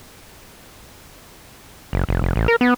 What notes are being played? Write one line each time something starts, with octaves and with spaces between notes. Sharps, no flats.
F#1
F1
F1
A1
A#4
B3